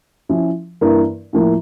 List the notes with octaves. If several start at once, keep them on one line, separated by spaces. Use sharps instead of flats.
F3 C#4 E4
G2 E3 A#3 E4 A#4
A2 F3 A#3 E4